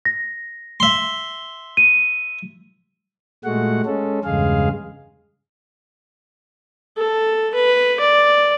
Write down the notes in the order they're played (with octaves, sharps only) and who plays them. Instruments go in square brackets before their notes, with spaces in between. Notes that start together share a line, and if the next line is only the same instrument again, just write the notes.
[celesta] A#6
[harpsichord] E5 C6
[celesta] D#7
[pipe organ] A#2 G#3 A3 F#4 F#5
G#3 C#4 A4
E2 G2 C#3 G#3 G#4 F5
[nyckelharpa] A4
B4
D5